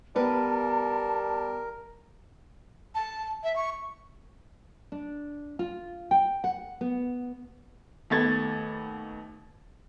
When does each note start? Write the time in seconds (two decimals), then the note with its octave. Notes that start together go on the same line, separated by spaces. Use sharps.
0.16 G3 B3 A#4 B4 A5
2.95 A5
3.44 E5
3.56 C#6
4.92 D4
5.59 F4
6.11 G5
6.44 F#5
6.81 B3
8.10 D#2 A3 B3 G#6 A6